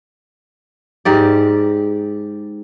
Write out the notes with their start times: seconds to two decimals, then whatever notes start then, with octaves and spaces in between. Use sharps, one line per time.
1.05 G#2 G4 D5